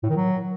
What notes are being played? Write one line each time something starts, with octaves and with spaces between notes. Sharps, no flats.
A2
D#3
F#3